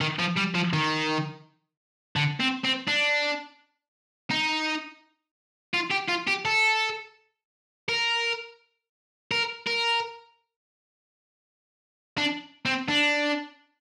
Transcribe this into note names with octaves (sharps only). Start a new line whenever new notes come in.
D#3
F3
G3
F3
D#3
D3
C4
C4
D4
D#4
F4
G4
F4
G4
A4
A#4
A#4
A#4
D4
C4
D4